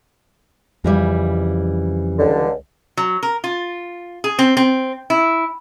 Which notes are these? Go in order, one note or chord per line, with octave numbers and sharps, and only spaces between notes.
F2 C#3 E3 G3
C#2 D3
F#3
A#4
F4
G#4
C4
C4
E4